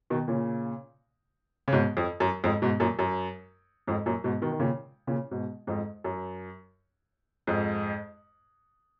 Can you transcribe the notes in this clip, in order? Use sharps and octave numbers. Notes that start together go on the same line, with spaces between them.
B2 D#3
A#2 C#3
C#3
G#2 B2
F2
F#2
F2 G#2
G#2 B2
F#2 A#2
F#2
F2 G#2
F#2 A#2
G#2 B2
B2 D#3
D#3
A#2 C#3
A#2 C#3
G#2 B2
F2 G#2
F#2
F2 G#2